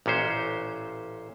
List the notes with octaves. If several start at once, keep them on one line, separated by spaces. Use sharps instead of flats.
A1 A#2 C#4 C5